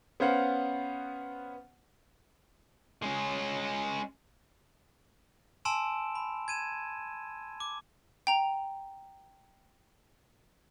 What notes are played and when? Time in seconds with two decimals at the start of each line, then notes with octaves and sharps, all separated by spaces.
0.20 B3 C#4 C5 F5 F#5
3.02 G#3 C#4
5.65 G#5 A5 C6 E6 D7 E7
6.15 B5
6.48 G#6 D#7 E7
7.60 D6
8.27 G5 A#5 F7